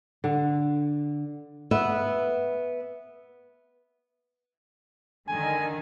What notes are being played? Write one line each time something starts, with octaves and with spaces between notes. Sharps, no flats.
D3
B3 B4 E5
D3 D#3 G#5